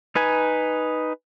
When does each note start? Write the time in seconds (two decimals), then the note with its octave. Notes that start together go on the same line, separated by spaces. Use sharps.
0.15 D#4 B4 G#5